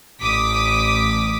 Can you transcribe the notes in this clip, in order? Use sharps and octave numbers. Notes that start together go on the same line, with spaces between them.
A1 D6 D#6 B6